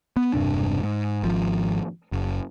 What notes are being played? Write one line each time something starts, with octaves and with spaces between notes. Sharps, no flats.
B3
E1 G2 C3 D4
G#2
G#1 F3
F#1